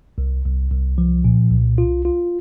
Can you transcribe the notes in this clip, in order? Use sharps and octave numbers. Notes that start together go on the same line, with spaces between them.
C2
C2
C2
F3
A#2
C2
F4
F4